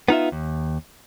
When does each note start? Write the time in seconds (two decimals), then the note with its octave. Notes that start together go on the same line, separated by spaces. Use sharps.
0.08 B3 D#4 F4 E5
0.32 D#2